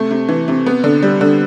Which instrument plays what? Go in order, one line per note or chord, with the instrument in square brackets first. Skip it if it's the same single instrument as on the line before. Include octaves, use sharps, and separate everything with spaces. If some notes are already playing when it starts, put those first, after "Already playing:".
Already playing: [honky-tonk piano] C3 A3
C3
E3
C3
B3
D3
G3
D3